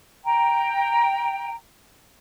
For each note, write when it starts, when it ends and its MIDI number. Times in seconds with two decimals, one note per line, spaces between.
0.24 1.53 79
0.24 1.53 82